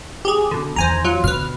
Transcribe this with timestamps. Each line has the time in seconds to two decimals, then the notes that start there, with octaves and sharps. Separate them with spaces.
0.25 G4 G#4
0.51 B2 D3
0.76 E2 D#3 C5 G#5 A#5
1.05 F#3 F4
1.24 B2 D3 B4 F6